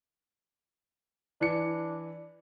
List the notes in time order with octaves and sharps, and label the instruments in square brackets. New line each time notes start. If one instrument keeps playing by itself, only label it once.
[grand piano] E3 C#7 [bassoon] D4